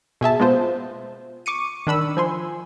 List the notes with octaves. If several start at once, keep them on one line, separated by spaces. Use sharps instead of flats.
B2 G#4 E5 A5
G#3 B3 F4 C5
C#6 D6 C#7 D#7
D#3 D4 B5 E6
F3 G#5 C6